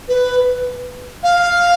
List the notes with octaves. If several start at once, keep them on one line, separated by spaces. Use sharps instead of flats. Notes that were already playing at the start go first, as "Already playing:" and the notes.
B4
F5